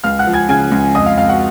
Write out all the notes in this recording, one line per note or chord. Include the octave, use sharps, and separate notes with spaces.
C#2 F5 F6
F#5 F#6
F3
G#5 G#6
C#3 G#5 G#6
C#2
F2 D#5 D#6
F5
F2 F5
F#4 F#5